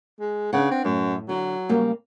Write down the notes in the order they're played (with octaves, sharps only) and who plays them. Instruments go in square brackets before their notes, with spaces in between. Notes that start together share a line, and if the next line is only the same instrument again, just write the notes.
[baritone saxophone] G#3
[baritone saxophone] C#3 [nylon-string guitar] D4 B4 F#5
[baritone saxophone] C4
[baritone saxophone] F#2 [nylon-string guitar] A2
[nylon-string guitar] D3 [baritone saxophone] F#3
[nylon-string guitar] C#3 G3 A#3